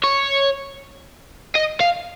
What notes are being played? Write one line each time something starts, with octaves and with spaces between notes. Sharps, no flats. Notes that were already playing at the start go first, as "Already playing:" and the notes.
C#5
D#5
F5